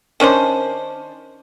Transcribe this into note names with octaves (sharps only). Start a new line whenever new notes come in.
D#3 C#4 D4 C5